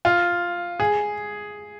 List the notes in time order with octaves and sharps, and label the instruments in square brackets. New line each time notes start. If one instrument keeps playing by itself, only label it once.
[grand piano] F4
G#4